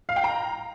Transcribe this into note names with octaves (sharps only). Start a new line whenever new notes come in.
F5
G5
A#5